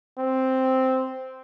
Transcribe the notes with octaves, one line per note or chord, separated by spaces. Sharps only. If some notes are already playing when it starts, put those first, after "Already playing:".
C4